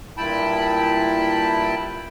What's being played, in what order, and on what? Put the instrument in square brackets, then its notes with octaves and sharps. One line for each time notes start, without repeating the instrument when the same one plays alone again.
[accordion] G2 A#2 E4 G5 A5 B5